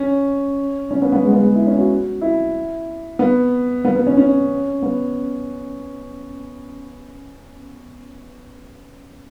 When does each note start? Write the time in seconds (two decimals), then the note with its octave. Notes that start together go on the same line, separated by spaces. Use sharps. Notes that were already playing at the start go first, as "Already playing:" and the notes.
Already playing: C#4
0.91 C#4
1.02 B3
1.12 B3
1.23 G#3
1.33 B3
1.40 G#3
1.55 E4
1.67 C#4
1.78 F#4
2.21 E4
3.19 B3
3.85 B3
3.96 B3
4.07 C#4
4.17 C#4
4.82 B3